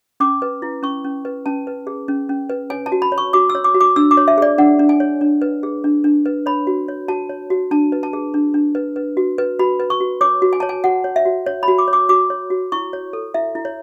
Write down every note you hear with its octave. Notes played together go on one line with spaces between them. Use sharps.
C#4 D6
B4
E4
C#4 C#6
C#4
B4
C#4 A5
B4
G#4
C#4
C#4
B4
C#5 G#5
A5
F#4
B5
C#5
C#6
F#4 D6
E6
C#5
D6
F#4
D6
D4 E6
D6
C#5
E5
G#4 D5
D4 F#5
D4
G#5
C#5
D4
B4
G#4
D4
D4
B4
C#5 B5
F#4
C#5
F#4 A5
C#5
F#4
D4 A5
B4
A5
G#4
D4
D4
B4
B4
F#4
B4
F#4 B5
B4
C#6
F#4
C#5 D6
F#4
G#5
C#5 A5
G#5
F#4 F#5
C#5
E5
F#4
C#5
B5
F#4
D6
C#5
D6
F#4 D6
C#5
F#4
E4 C#6
C#5
A4
E4 E5
E4
C#5